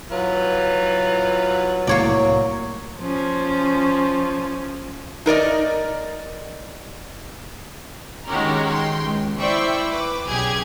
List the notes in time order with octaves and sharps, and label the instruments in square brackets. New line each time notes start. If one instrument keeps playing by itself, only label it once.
[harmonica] E3 F4 B4 [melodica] F#3
[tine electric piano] C2 A2 [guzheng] A#3 C#5 D5
[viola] F3 C#4
[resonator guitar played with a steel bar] D#4 A#4 D5 D#5
[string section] D#3 G#3 C#4 F#4 G4 A#4
G5 C6
C#2
E4 C5 D5 E5 G5 C#6
B4 D6
B1 C#3 G4 G#4 G#6